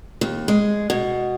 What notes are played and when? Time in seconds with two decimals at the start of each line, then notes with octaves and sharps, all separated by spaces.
0.21 D#2
0.48 G#3
0.90 B2